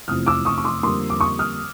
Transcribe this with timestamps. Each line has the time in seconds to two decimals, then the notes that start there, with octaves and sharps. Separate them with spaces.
0.08 F1 E2 C3 F3 D#6 F6
0.27 D6 E6
0.45 C#6 D#6
0.58 C#6
0.64 C6 D6
0.83 F2 D3 G3 A#3 C6 D6
1.10 D6
1.20 C#6 D#6
1.39 D#6 F6